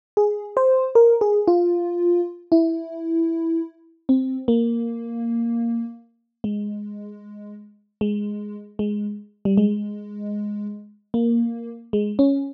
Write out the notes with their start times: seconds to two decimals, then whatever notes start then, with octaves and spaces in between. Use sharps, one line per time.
0.17 G#4
0.57 C5
0.95 A#4
1.21 G#4
1.48 F4
2.52 E4
4.09 C4
4.48 A#3
6.44 G#3
8.01 G#3
8.79 G#3
9.45 G3
9.57 G#3
11.14 A#3
11.93 G#3
12.19 C#4